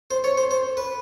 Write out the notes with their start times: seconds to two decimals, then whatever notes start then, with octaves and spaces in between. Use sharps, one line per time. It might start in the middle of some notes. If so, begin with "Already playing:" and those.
0.11 C5
0.24 C#5
0.37 C5
0.51 C5
0.77 B4